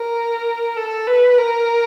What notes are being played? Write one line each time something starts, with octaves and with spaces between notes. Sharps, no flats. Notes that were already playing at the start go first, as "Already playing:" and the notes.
Already playing: A#4
A4
B4
A#4